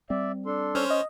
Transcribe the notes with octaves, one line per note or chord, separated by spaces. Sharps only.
G3 C4 D5 E5
D4 A4 C6
C#4 C5 C#5 F6
D#5